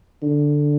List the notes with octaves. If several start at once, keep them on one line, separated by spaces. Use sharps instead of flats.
D3